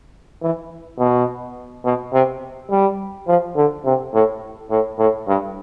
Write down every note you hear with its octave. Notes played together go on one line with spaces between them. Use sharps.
E3
B2
B2
C3
G3
F3
D3
C3
A2
A2
A2
G2